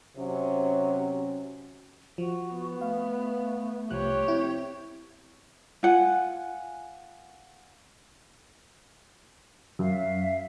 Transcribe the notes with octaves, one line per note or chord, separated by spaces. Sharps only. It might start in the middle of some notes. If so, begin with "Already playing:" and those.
C3 F#3 C#4
F3 F#4
B3
A3 F5
C2 F3 G4 C#5 F#6
C4 E4
F4 F#5 G#5
F#2 E5 F5